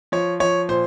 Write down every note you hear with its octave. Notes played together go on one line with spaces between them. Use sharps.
F3 C#5
F3 C#5
A#2 C5